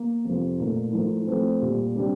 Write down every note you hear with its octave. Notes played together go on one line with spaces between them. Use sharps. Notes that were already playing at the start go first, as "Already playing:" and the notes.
Already playing: A#3
F2 C3 F3
A#2 A3 D#4 A#4
A2 F3 A3 D#4
F3 A3 C4
A#2 G3 A#3
C3 G3 D4 G4